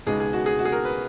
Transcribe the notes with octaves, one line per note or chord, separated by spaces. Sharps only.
C#2 B2 G#3 B3 D#4 G#4
G#4
F#4
G#4
F#4
G#4
A#4
B4